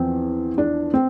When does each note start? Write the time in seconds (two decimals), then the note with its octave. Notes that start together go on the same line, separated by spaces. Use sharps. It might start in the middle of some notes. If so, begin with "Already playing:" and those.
Already playing: E2 F3 C4
0.58 D4
0.94 C4